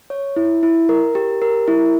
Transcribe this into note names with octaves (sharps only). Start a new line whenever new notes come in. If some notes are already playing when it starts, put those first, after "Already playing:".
C#5
E4
E4
A#4
G4
A#4
E4